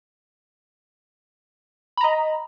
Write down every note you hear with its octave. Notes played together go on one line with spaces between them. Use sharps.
D#5 A#5 B5